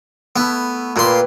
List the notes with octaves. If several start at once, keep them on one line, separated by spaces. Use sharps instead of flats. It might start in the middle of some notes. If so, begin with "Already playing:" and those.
A3 B3 E4
A#2 E4 G4 B4 C6